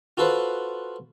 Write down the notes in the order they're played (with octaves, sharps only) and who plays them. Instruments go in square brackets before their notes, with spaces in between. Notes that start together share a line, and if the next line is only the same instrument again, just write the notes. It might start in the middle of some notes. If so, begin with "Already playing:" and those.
[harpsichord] F4 F#4 A4 B4 C5